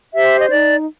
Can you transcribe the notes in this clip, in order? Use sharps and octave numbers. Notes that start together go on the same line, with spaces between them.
G4 C5 E5
D#5
D#4 D5